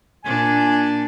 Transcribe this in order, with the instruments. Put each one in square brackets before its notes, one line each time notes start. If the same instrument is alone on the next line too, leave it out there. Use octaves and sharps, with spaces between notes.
[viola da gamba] A#2 D4 [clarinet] G#5